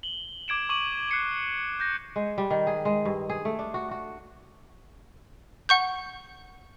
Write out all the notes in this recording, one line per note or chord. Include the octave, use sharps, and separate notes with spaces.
F#7 G7
D6 G#6 D7 E7
C#6 D6 D#7 F#7
F#6 C7 C#7 F#7
G6 A#6
G#3
G3
D#3
G#4
G#3
G2
G#4
A3
D4
F#4
F#4
F#5 C#6 G6